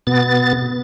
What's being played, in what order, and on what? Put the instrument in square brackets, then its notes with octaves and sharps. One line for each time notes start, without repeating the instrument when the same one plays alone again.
[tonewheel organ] B2 B3 A6